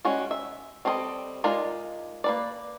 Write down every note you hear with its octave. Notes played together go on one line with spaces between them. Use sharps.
G3 G#3 C#4 F#4
E5
G3 C4 A4 C5 D#5
G#3 D#4 F4 A#4 D5
A#3 B4 D5